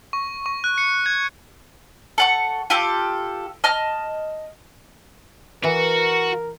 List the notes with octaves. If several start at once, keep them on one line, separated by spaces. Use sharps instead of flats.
C#6
C#6
F#6
C#7
G#6
A4 F#5 C#6
F4 G4 A4
D#5 A5 F6
E3 F#4 A#4